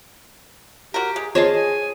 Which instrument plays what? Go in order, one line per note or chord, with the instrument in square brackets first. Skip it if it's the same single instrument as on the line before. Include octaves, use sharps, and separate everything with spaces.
[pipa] F#4 A#4 [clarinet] G4
[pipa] G#3
[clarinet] F4 [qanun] G#4 D#5 A5 [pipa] C5 C#5
[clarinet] G#5